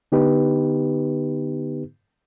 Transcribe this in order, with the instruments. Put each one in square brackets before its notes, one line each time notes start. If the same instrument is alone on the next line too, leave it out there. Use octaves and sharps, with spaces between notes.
[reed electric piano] D3 B3 D#4 G4 B4